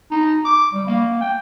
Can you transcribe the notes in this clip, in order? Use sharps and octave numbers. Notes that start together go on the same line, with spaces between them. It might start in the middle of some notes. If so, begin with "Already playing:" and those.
D#4
D6
G3
A#3
G5